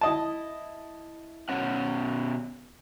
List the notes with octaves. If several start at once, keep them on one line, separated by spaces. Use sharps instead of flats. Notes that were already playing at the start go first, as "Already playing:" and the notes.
E4 D#5 A5
B2 C#4 F#5